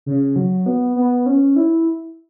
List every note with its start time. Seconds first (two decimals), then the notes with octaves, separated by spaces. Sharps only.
0.06 C#3
0.36 F#3
0.66 B3
0.96 B3
1.26 C#4
1.56 E4